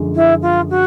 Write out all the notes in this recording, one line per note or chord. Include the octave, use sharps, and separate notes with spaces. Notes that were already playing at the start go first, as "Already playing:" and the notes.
Already playing: F#2 D3 F3 G#3
E4
F4
F#4